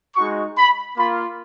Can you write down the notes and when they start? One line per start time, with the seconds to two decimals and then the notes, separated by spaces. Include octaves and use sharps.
0.16 G#3 D#4 F#4 C#6
0.57 B5
0.97 A#3 F4 B5